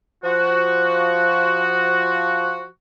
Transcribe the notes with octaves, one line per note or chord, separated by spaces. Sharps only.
F3 F#4